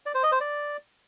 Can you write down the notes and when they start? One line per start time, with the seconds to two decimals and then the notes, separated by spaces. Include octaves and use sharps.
0.06 D5
0.15 C5
0.23 D#5
0.32 C5
0.41 D5